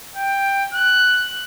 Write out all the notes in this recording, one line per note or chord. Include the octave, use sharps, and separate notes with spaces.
G5
F#6